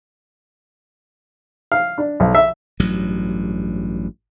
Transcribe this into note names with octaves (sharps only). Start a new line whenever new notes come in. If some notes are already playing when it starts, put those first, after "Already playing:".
F5
D4
B1
E5
A1 G2 F#3